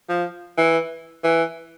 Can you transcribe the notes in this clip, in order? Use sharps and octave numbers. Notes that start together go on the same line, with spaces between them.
F3
E3
E3